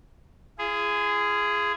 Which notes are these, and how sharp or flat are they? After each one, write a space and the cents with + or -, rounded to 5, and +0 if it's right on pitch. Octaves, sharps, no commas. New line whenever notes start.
F4 -45 G#4 +0